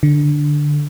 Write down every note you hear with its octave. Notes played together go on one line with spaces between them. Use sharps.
D3